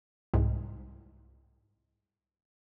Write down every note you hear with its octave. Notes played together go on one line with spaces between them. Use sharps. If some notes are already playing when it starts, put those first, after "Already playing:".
C2 G#2